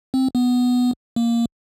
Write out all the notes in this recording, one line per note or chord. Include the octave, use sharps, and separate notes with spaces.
C4
B3
A#3